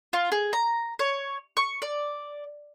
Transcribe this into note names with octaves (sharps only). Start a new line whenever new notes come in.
F4
G#4
A#5
C#5
C#6
D5